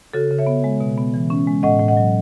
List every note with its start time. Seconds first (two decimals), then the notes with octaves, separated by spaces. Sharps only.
0.13 C#3 F#4 A4
0.30 C#3
0.39 C#5 E5
0.47 B3
0.64 G#3
0.80 B2
0.98 B3
1.14 E3
1.30 C#4
1.47 G#3
1.63 A2 D#5 F#5
1.80 A2
1.88 D#5 F#5
1.97 F#3